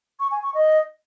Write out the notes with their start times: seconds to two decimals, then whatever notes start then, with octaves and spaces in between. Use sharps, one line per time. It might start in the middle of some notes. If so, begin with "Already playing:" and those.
0.20 C#6
0.31 G#5
0.43 C#6
0.54 D#5